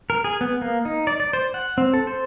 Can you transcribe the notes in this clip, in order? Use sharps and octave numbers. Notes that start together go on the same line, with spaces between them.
A#4
G#4
B3
A#3
D#4
D5
D5
C5
F#5
C4
A4
C5